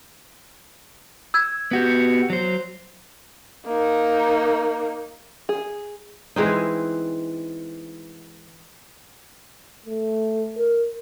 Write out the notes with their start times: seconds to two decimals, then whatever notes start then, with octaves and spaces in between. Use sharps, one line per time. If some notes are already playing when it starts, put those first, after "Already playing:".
1.34 E6 G#6
1.71 B3 F#4 G4
2.30 F#3 C5
3.66 A#3 D#4
5.49 G#4
6.36 E3 G#3 C4 D#4
9.86 A3
10.58 A#4